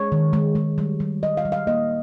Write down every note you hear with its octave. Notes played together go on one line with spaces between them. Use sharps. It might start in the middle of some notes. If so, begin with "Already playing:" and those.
Already playing: G#3 C#5
D#3
G#3
G#3
G3
G3
G3 D#5
F5
G3
F5
A#3 D#5